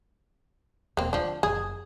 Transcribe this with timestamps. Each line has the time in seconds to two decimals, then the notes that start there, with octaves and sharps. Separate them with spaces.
0.97 D#1 A#3 C4
1.13 D2 F3 D4
1.43 F#1 G#4